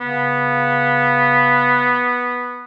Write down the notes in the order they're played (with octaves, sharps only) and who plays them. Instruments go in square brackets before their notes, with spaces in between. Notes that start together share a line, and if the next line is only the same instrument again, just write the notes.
[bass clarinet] C#3 [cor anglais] B3